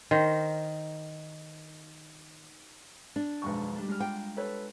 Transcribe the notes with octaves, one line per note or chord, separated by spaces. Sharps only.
D#3 A#4 C5
D4
B1 F2 D#3 G#3 C#6
G3 D4 A4
G3 G#3 F6
F4 G5 A#5
A4 B4 C#5